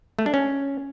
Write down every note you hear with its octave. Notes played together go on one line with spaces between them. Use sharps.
A3
D4
C#4